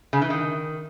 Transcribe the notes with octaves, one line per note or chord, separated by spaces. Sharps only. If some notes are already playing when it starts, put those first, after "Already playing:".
C#3
E3
D#3